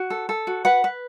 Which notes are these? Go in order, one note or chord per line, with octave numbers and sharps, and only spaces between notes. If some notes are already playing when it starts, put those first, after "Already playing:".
Already playing: F#4
A4
A4
F#4
B4 F#5
B4